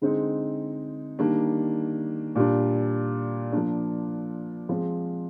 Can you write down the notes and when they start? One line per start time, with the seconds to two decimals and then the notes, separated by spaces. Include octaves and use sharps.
0.02 D3 G#3 C4 D#4
1.19 D#3 G3 A#3 D4
2.35 A#2 G3 D4
3.52 F3 A#3 D4
4.69 F3 G#3 C4